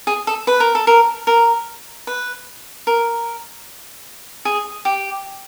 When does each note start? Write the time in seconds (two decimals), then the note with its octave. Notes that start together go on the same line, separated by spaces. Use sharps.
0.07 G#4
0.27 A4
0.47 B4
0.60 A#4
0.75 A4
0.87 A#4
1.27 A#4
2.07 B4
2.87 A#4
4.45 G#4
4.85 G4